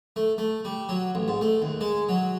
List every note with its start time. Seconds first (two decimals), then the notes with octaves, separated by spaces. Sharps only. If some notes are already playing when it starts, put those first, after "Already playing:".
0.16 A3
0.38 A3
0.65 G3
0.89 F#3
1.15 A1
1.28 G#2
1.41 A3
1.62 D#2
1.81 G#3
2.09 F#3